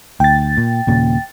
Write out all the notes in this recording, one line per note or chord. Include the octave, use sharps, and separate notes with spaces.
D2 G5 A6
A#2
D#2 A#2 C#3